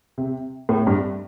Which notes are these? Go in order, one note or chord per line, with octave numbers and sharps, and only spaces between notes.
C3
A2
G2